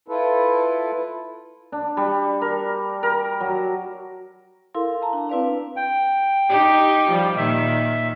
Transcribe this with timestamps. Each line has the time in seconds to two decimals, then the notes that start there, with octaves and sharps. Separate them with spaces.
0.08 E4 F4 A4 B4
1.72 D4
1.97 G3
2.41 A#4
3.03 A#4
3.41 F#3
4.74 E4 A4 A#4 F5 C6
5.01 F5 A5 A#5
5.13 D4
5.29 C4 E4 B4 D5 F5
5.76 G5
6.49 D#4 G4
7.09 F3 G3
7.37 A#2 D#3 E5